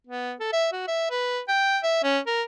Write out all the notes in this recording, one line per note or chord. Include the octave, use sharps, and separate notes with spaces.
B3
A4
E5
F#4
E5
B4
G5
E5
C#4
A#4